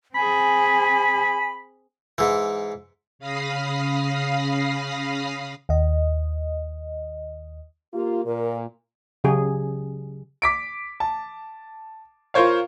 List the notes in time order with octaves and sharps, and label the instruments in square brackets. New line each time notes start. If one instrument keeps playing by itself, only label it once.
[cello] C4 G#4 [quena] G#5 [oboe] B5
[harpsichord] G#2 E3
[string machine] C#3 F5 B5 D#6 A#6 C7
[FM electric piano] D#2 D#5
[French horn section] A#3 F4 [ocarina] G4
[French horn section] A#2 [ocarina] A#4
[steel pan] C#3 F#3 G4 G#4
[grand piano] D6 B6 D7
A5
F4 A#4 C5 C#5 F5